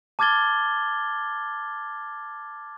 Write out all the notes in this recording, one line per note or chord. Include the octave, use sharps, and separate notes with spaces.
A5 D6 F6 G#6 A6 G7